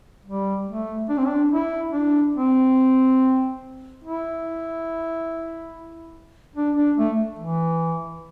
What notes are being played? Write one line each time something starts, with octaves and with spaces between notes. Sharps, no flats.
G3
A3
D4
C4
D4
E4
D4
C4
E4
D4
D4
A3
E3